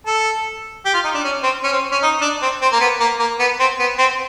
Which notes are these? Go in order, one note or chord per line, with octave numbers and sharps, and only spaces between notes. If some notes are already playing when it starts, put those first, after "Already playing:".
A4
G4
F4
D#4
D4
C#4
C4
C#4
C4
C#4
D#4
D4
C4
C4
A#3
B3
A#3
A#3
B3
C4
B3
C4